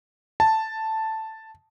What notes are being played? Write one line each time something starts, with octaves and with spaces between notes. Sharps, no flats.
A5